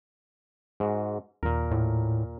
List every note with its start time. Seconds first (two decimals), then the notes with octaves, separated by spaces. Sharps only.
0.80 G#2 F#4
1.43 D#2 A#2 A#4
1.71 A2